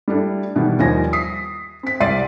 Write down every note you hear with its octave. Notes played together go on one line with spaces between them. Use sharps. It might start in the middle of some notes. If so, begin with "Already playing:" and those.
G3 A3 D4 E4
B2 D#3 E3 G3 B3
D#2 F3 G3 D#4 G#5 A#6
D#6 B6 C7
C4 B6
C2 D5 C6 A6 C7 D#7